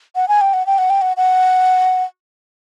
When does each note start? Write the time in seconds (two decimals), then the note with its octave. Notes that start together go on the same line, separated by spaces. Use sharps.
0.16 F#5
0.28 G#5
0.41 G5
0.53 F#5
0.67 G5
0.78 F#5
0.90 G5
1.02 F#5
1.17 F#5